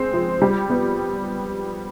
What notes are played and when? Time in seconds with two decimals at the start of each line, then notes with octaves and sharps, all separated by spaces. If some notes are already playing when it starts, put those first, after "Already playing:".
Already playing: G#3 C4
0.14 F3
0.42 G3
0.70 B3